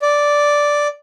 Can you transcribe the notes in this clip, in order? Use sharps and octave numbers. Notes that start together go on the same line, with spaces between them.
D5